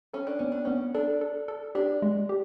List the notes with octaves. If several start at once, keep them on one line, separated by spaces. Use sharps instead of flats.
C#4 A4
D4
B3 C#4
D4
B3 C#4
D4 A4
A4
A4
D4 G4
G#3
G4